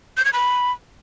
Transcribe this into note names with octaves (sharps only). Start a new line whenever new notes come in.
G6
G#6
B5